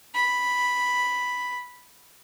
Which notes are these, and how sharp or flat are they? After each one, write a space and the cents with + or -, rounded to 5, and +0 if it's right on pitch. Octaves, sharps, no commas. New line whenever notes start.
B5 +0